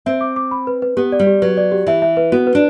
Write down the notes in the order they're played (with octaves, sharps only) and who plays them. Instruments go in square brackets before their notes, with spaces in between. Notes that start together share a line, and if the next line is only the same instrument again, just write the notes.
[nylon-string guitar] C4 [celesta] E5
[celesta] D6
D6
B5
B4
B4
[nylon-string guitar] B3 [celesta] G4
[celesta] D5
[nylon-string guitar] G3
[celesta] G4
[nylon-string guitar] F#3 [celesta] B4
[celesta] D5
G4
[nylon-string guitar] E3 [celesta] E5
[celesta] E5
B4
[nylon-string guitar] B3 [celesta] F#4
[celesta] B4
[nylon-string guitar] D4